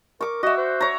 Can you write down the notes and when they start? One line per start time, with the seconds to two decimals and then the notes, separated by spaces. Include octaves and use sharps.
0.21 A#4 C#6 D6
0.43 F#4 D#5 E5
0.58 C5
0.81 C#5 A#5